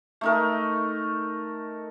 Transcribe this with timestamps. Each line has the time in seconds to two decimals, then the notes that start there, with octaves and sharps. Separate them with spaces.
0.21 A3 D#4 A#4